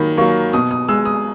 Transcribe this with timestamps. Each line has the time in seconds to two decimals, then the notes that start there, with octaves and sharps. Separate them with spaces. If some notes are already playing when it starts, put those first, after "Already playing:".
Already playing: D#3 F#3 A#3 B5
0.18 F#3 A#3 C#6
0.53 B2 D#6
0.71 D#6
0.89 G#3 E6
1.05 D#6